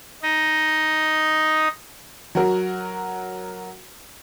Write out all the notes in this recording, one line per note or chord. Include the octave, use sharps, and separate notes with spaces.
D#4 D#5
F#3 F#4 A#4